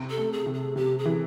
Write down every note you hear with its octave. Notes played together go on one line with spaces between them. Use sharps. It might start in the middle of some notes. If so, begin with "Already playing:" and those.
Already playing: C3
A4
A3
G#4
C3
G#4
C3 G4
G#4
E3